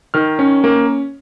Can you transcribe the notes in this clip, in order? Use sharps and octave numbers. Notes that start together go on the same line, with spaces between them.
D#3 F6
C#4
A#3